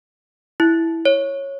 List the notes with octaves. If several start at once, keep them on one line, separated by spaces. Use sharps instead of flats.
E4
C#5